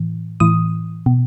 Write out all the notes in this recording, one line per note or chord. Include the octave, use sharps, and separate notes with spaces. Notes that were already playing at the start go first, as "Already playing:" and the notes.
Already playing: A2 E3
A2 E3 D#6
B2